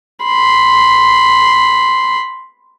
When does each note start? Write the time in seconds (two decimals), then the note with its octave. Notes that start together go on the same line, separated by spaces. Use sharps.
0.24 B5 C6